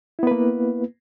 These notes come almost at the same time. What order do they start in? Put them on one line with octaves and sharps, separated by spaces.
E4 B3 B4 A#3